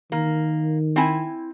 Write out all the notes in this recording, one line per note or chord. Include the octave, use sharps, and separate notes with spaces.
D#3 A#3
C4 E4 G#5